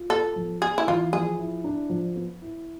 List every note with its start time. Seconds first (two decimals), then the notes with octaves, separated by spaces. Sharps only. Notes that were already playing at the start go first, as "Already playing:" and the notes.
Already playing: F4
0.10 B3 A4
0.36 F3
0.62 B3 G#4
0.78 E4
0.88 E3 F4
1.13 F3 G#4
1.39 E4
1.64 D4
1.90 F3
2.16 B3
2.42 E4